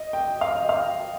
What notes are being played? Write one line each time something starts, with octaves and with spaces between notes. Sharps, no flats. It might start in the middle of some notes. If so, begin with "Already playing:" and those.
Already playing: D#5
G5
F5
D#5
F5